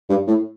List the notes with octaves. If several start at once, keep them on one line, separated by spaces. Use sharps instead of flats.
G2
A2